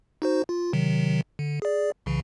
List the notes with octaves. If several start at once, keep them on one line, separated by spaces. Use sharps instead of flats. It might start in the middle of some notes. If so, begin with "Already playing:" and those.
D#4 F#4 C5
F4
C3 D#3 F#3
D3
G#4 D5
C2 C#3 E3